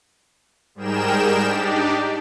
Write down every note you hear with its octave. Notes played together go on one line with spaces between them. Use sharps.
G#2 G3 G#4 A#4 G5 E7
D4 D#4 G4 D5